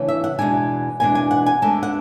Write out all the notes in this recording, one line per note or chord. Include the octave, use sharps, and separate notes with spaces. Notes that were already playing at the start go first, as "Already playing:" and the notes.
Already playing: C#3 E3 A3 D4
E5
F#5
E2 B2 G#3 D4 G#5
E2 B2 G#3 D4 G#5
G#5
F#5
G#5
D2 D3 G#3 B3 A5
F#5